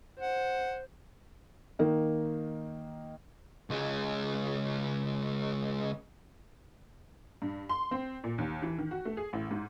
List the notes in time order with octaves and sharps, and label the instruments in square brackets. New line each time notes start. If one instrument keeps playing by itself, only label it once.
[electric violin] C5 [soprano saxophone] F#5
[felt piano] D#3 A#3 D#4
[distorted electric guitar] C#2 G#3
[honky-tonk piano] G2
C6
C4
A#2
D#2
E3
D#3
F#4
A3
G#4
A1
G#2